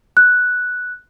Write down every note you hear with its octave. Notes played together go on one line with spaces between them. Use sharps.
F#6